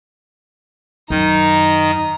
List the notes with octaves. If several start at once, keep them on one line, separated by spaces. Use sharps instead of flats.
F#2 D#3 D#4 A#5